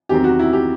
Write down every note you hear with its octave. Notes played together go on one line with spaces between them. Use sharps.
E2 D#3 F#3 C4 G4
F#4
E4
G4